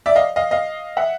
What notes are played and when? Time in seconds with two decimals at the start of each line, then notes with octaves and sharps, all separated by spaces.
0.06 D5 E5
0.16 D#5 F5
0.36 D#5 F5
0.51 D#5 F5
0.97 E5 F#5